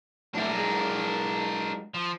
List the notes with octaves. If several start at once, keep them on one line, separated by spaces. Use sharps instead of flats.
F#2 A2 D4 E4 A#4
F#2 G#3
F3